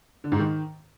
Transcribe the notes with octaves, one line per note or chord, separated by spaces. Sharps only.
D3
G#2
D#3